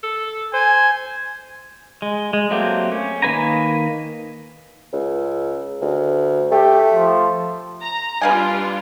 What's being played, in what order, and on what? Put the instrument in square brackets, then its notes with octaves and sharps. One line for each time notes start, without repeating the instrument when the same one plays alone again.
[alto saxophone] A4
[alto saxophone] C5 [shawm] G#5
[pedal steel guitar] G#3
G#3
F#3 A3 A#3 C4 G4
C#4
D#3 A#3 B4 G#5 A#5
[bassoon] C#2
D2
[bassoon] A3 [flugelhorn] G4
[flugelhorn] F3
[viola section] A#5
[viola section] G3 D4 F4 [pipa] B4 F5 G#5